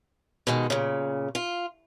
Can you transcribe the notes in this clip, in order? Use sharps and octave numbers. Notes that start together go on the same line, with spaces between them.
B2 D#3 G#3
A#2 C#3
F4